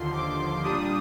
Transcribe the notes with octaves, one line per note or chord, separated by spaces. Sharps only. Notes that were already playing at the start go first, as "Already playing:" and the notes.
Already playing: D#2 D3 F3 C6
D6
A#2 G3 D4 D#6